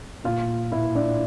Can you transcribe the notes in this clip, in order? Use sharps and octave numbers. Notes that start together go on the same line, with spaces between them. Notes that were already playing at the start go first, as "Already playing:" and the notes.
A#2 F4 F5
A#2 E4 E5
D4 D5